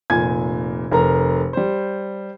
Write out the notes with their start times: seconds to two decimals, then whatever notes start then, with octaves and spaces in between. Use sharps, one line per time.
0.10 F1 A#2 G#5 G#6
0.92 F1 A#4 A#5
1.53 G3 C5